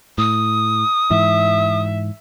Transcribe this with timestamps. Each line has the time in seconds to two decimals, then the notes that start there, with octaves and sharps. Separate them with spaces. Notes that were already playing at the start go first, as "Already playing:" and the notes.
0.18 A2 D#6
1.10 G#2 E3 E5